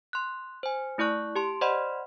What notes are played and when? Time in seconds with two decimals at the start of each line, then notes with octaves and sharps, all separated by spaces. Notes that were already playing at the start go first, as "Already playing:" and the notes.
0.13 C6 F#6
0.63 C5 G#5
0.98 A3 E4 D5 C#6 F#6
1.36 G4 A5 C6
1.61 C5 D5 D#5 F#5 B5 C6